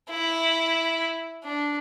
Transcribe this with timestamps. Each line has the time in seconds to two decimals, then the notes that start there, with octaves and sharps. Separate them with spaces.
0.10 E4
1.44 D4